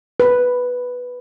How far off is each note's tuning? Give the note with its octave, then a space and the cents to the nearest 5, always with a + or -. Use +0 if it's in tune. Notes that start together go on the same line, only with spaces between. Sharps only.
B4 +0